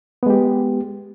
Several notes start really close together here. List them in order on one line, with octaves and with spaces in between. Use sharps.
B3 G#3 G4